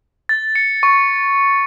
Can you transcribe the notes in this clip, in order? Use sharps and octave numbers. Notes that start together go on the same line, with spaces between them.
A6
C#7
C#6